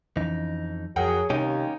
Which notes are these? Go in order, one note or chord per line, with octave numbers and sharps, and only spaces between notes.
F2 E3 C#4 D#4
F2 F3 F#3 G#4 A#4 F#5 G5
D#2 C3 G3 C#4 D#4 G4